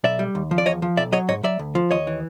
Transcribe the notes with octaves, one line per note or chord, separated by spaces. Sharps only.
B1 D5 E5
G3
D#2
F3
D5
E2 C#5 D#5
F3
B1 D5 E5
F#3 C#5 D#5
G#2 C#5 D#5
F#3 D5 E5
D2
F3
D#2 C#5 D#5
E3